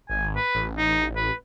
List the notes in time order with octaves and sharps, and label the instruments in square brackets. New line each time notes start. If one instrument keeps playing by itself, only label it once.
[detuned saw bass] G#1 [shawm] G#5
[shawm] B4
[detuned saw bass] A1
[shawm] D#4
B4